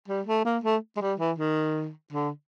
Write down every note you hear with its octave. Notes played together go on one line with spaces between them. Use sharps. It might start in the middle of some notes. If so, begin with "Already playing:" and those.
G3
A3
A#3
A3
G#3
G3
E3
D#3
D3